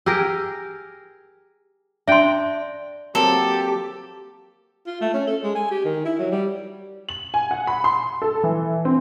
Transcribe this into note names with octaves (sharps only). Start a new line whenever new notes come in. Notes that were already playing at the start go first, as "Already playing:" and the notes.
G4 G#4 A#4 E6
D4 E5 G5 C6
F#3 A#3 C4 G4 A4
F4
A3
C#4
A4
G#3
G#5
G4
D#3
E4
F#3
G3
F#7
G#5
F#5
B5
C6
A4
E3
C4